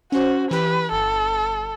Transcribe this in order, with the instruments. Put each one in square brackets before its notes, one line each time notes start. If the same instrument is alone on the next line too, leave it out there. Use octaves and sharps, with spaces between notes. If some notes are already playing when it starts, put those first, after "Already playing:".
[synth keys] C#4 C5 [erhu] F#4
[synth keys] E3 G4 [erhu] B4
[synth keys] G1 [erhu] A4